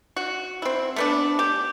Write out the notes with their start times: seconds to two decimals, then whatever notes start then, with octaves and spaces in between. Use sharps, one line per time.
0.16 F#4
0.62 C4 E4
0.96 A3 B3 D4
1.39 G4